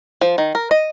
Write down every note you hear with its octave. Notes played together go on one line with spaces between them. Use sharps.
F3
D#3
A#4
D#5